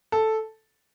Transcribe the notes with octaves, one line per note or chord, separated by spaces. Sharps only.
A4